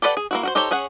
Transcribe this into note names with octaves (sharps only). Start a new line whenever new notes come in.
G4 A4 B4 D5 F#5
G#4
A#3 E4 F#4
F#4 A#4 C5
D#4 G4 A4 C5 C#5
C#4 G#4 C#5 F#5